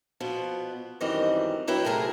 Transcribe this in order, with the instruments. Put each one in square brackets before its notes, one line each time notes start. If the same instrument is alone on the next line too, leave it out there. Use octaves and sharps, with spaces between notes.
[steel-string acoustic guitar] B2 F3 B3
F#2 D#3 E3 G3 C4 D#5
F#3 E4 B4 G5
C3 A3 G#4 A#4